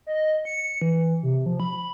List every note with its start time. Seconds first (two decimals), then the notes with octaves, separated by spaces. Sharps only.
0.07 D#5
0.45 C#7
0.82 E3
1.23 C3
1.46 F3
1.60 B5